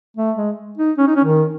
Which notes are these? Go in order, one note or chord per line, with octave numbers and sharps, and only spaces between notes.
A3
G#3
D#4
C#4
D#4
C#4
D#3